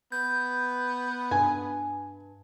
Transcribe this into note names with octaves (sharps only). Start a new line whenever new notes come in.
B3 G6
G2 G#5